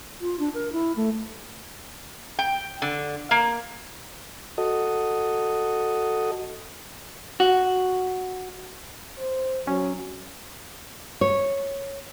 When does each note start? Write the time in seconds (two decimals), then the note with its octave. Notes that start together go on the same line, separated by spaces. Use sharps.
0.21 F4
0.39 D4
0.54 A#4
0.72 E4
0.96 A3
2.39 G5
2.82 D3
3.31 A#3
4.58 F#4 A4 D#5
7.40 F#4
9.18 C5
9.67 F#3 C#4
11.21 C#5